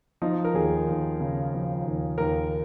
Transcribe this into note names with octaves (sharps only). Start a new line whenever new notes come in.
F3 D#4
A#4
D#2 G#4
D#2
C#3
F3
D#2
D#2 A#4